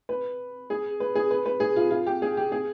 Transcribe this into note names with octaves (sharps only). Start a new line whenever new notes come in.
B4
G#4
B4
G#4
B4
B4
G#4
F4
F4
G4
G#4
G4
G#4